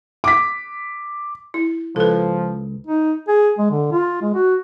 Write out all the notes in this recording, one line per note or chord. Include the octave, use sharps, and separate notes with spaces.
D6 B6
E4
C#2 F3 A4 B4
D#4
G#4
G#3
D3
F4
G#3
F#4